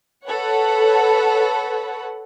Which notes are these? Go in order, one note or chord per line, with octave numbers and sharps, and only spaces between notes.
A4 B4 C#5 F#5